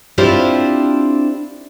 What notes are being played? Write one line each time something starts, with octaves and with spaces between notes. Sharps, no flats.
C4 D4 E4 F4 G4 C5